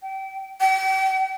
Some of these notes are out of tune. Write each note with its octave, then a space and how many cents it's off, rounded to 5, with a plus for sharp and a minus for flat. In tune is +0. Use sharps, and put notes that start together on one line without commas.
G5 -30
G5 -40